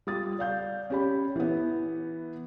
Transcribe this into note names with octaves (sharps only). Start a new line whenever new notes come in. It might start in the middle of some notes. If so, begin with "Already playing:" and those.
G3 F4 D#6 A6
D5 F5 G6
C#4 G4 B5
E3 B3